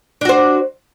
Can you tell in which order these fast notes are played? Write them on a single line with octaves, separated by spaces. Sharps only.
D4 F#4 C5